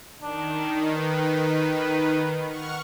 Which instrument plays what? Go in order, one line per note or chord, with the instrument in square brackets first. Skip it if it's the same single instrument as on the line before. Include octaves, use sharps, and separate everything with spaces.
[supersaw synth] D#3 [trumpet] D4
[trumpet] B4
[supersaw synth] F#5 C#6 F6